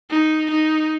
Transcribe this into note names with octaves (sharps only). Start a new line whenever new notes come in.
D#4
D#4